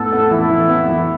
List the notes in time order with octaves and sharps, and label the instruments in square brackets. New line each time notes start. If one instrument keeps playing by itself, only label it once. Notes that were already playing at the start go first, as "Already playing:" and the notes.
Already playing: [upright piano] A2 B3 [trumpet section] A4
[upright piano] B3
[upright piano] E3 [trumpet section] E4
[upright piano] E3
B3
E3